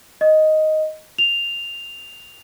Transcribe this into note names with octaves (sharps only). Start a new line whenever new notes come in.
D#5
F7